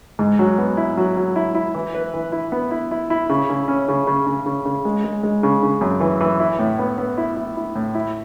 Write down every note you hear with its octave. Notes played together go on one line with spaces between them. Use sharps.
G#2
F#3
B3
E4
F#3
F#3
E4
E4
E3
B4
E3
E4
B3
E4
E4
E4
C#3
C#3
C#4
C#3
C#3
C#3
C#3
C#3
G#3
G#3
G#3
C#3
C#3
F#2
E3
E3
E4
A2
B3
B3
E4
E4
E4
A2
E4